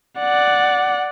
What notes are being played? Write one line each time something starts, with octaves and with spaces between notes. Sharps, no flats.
D5 F#5